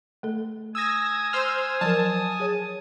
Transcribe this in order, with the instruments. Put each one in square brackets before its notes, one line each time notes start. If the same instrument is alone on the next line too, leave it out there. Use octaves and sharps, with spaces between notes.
[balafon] A3 A4
[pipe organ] G#5 D#6 [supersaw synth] E6 G#6 A#6
[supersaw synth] C5 E6 F6
[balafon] F3 F#3 A#4 [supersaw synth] A5
[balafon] G#4 C#5